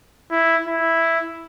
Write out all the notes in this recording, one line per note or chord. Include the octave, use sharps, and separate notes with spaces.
E4
E4